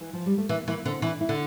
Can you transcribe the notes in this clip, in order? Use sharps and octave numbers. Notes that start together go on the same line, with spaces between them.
E3
F3
G3
A3
E3 A#3
E3 A#3
D3 C4
E3 D4
E4
D3